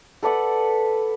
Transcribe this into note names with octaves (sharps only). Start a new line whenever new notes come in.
A4 B4 D5 F#5